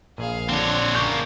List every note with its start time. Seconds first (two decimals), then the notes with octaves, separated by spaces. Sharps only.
0.18 A#1 G#4 F5
0.49 D3 C4 D4 C#5
0.95 C#3 A#3 C#6 G6